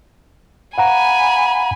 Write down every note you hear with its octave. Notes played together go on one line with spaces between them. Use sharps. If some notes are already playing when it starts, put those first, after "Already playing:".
F5 F#5 G#5 A#5 B5